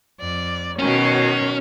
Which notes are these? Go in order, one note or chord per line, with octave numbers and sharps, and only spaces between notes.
F2 D5
B2 D#3 F#3 C#4